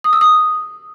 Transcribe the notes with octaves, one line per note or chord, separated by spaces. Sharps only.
D#6
E6
D#6